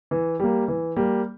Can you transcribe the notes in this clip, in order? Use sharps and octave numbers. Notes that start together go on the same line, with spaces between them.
E3
G3 A#3
E3
G3 A#3